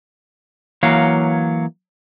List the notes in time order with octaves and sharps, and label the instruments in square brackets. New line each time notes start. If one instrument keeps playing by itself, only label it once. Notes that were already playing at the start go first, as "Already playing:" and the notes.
[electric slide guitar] E3 F#3 A#3 C#5 F5